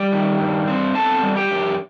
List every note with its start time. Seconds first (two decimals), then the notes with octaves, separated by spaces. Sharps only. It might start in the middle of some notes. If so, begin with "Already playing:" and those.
Already playing: G3 G4 G5
0.12 D#3
0.41 G2
0.68 C4
0.95 B3 A4 A5
1.23 G3
1.36 G4 G5
1.51 F#2